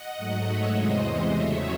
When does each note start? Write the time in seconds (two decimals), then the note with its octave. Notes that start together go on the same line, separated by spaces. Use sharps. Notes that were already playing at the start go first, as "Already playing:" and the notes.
Already playing: D#5 F#5
0.17 G#2 F#3 A3
0.46 C#5 E5
0.75 E2 C3 E3 G#3 C5 D#5
1.33 E2 C#3 F#3 A3 C#5 E5